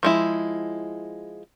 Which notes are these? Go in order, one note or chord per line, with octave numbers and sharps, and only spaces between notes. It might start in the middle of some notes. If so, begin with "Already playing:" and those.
F3 G#3 E4